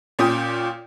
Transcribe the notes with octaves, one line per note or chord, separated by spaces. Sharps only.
A#2 C#4 G5 D#6